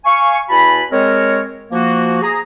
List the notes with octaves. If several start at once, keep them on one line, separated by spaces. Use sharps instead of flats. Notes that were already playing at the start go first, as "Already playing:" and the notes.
F5 G#5 C#6
E2 F#4 G#5 A5 B5
G#3 C4 A#4 C#5
F3 A#3 F#4
G#4 A#5